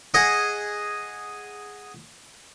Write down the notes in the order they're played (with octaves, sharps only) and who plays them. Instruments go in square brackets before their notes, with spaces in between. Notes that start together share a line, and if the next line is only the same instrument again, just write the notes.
[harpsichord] G#4 D#5 F#5